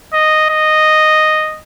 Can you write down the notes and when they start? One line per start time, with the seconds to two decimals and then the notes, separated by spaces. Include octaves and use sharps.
0.13 D#5
0.49 D#5